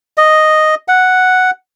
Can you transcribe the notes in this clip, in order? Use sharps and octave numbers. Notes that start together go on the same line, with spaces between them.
D#5
F#5